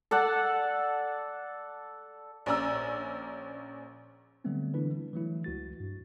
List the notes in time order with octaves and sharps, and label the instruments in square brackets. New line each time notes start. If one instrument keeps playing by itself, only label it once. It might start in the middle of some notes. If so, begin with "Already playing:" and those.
[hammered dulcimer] A4 D5 F#5 A5
[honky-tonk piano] A#1 C#4 D5 A#5 E6
[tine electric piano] D3 F#3 G3 A3 B3 C4
D3 E3 D4 E4 B4
G3
E3 F#3 A3 E4
C#2 F#4 A6
G2